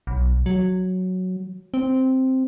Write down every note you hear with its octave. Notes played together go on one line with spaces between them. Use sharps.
B1
F#3
C4